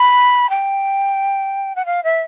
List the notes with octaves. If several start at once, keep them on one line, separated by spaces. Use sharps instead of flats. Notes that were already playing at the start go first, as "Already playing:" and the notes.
Already playing: B5
G5
F#5
F5
E5